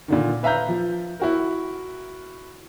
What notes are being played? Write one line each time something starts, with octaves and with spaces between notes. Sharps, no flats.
A#2 D3 D#3
B4 E5 F5 A#5 G6
F3
E4 F#4 A#4